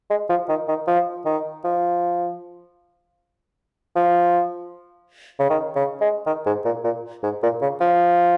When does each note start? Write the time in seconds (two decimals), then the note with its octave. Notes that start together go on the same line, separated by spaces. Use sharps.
0.10 G#3
0.30 F3
0.49 D#3
0.68 D#3
0.87 F3
1.25 D#3
1.64 F3
3.96 F3
5.40 C#3
5.50 D#3
5.75 C#3
6.01 G#3
6.26 D#3
6.46 G#2
6.65 A#2
6.84 A#2
7.23 G#2
7.43 A#2
7.61 C#3
7.80 F3